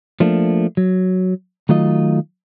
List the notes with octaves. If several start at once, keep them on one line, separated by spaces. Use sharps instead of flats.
F3 A3 A#3 D4
F#3
D#3 F#3 A3 F4 D#5